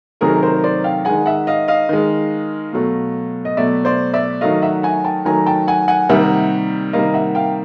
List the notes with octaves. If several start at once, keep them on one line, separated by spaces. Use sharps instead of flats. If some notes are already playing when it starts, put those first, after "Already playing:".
C3 D#3 F#3 A3 G#4 A#4
A#4 C5
C5 D5
F5 G5
D#3 G#3 F#5 G#5
E5 F#5
D#5 F5
D#5 F5
D#3 G#3
B2 F#3 A3
D#5
B2 F#3 A3 D5 E5
C5 D5
D5 E5
D#3 F#3 A3 D#5 F5
E5 F#5
F#5 G#5
G5 A5
D#3 F#3 A3 G#5 A#5
G5 A5
F#5 G#5
F#5 G#5
C3 D#3 G3 A#3 E5 F#5
C3 D#3 G3 A#3 D#5 F5
E5 F#5
F5 G5